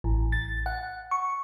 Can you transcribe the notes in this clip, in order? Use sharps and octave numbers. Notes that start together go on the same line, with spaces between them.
A1
A6
F#5
C#6